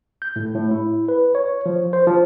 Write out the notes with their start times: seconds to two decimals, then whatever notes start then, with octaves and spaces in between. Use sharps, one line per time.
0.22 G6
0.36 A2
0.55 A2
0.71 E4
1.08 B4
1.35 C#5
1.66 F3
1.93 C5
2.07 F3